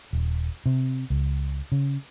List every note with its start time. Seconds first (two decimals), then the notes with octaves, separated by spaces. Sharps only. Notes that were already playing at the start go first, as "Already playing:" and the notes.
0.13 D#1
0.66 C3
1.10 C#2
1.72 C#3